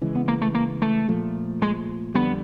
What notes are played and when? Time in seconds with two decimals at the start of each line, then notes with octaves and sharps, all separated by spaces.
0.01 C#3 E3 G#3
0.15 B3
0.28 A#3
0.42 A3
0.55 A#3
0.82 A3
1.08 A#2 F3 A3
1.62 G#3
2.14 F2 D3 G3 B3